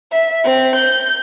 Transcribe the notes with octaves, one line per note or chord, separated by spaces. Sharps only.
E5
C4
G6